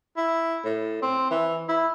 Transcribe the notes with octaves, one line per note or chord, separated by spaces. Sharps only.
E4
A2
C4
E3
E4